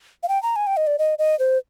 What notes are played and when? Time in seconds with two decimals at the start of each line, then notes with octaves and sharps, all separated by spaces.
0.23 F5
0.28 G5
0.43 A#5
0.56 G#5
0.67 G5
0.77 D#5
0.87 D5
0.99 D#5
1.19 D#5
1.39 C5